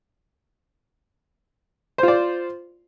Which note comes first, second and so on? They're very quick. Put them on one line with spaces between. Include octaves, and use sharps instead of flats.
C5 F4 D5